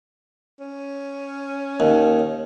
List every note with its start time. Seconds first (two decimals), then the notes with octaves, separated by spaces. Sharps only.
0.60 C#4
1.80 D#2